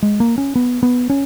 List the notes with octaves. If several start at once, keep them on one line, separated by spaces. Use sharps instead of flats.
G#3
A#3
C#4
B3
B3
C#4